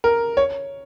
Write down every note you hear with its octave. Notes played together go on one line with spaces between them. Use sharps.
A#4
C#5